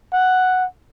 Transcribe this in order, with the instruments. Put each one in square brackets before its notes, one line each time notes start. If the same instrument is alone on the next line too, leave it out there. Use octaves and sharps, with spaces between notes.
[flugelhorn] F#5